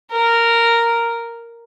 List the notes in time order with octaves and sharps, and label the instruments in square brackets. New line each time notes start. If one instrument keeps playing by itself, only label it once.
[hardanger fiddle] A#4